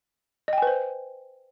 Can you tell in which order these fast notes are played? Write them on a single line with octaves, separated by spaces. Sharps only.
D#5 G5 G#5 B4 C5